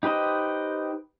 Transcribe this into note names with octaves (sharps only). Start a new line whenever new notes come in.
D#4 G4 B4 C5 D#5